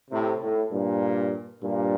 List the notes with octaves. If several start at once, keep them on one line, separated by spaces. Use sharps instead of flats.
A2 C3
A2
G2 A#2
G2 A#2